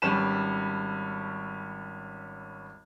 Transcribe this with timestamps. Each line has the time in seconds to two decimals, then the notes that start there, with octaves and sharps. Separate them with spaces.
0.02 G#1 G3 C#4 B4 A5 E7